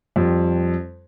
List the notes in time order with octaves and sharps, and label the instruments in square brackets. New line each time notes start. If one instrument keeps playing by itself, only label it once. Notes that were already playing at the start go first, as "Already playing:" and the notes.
[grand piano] F2 G3